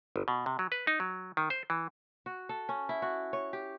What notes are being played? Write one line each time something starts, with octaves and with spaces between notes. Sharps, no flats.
G1
B2
C3
F#3
B4
D#4
F#3
D#3
C5
E3
F#4
A4
C#4
E4
F#4
C#5
G4